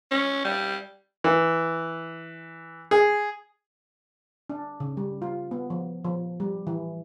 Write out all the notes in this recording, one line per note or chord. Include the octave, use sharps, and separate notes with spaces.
C#4
G3
E3
G#4
D4
C#3
G3
F4
B3
F3
F3
G3
E3